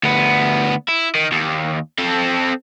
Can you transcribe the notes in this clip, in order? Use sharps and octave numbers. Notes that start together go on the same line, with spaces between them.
D2 B3
E4
D#3
D#2
C4 A4